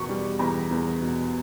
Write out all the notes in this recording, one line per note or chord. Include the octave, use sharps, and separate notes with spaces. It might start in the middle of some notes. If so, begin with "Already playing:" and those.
Already playing: E2 B2 C#6
G3
E2 A#5
E2
B2